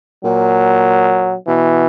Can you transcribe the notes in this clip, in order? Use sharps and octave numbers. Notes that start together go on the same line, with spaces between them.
A#2 F#3
B2 E3